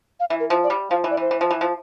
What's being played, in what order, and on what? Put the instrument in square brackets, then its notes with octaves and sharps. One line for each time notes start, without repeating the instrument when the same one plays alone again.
[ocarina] F5
[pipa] E3 [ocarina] E5
[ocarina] A#4
[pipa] F3
[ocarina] D5
[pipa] G3
[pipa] F3 [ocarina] F5
[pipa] E3
[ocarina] D5
[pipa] E3 [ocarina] C5
[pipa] E3
F3
E3
F3